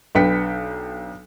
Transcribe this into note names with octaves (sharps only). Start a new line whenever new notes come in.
B1 D4 B4 G5 B6 C#7